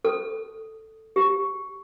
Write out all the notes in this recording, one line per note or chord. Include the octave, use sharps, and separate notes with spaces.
A4
G4